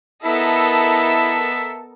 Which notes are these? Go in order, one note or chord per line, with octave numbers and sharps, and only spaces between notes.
B3 E4 A4 A#4 D#5 E5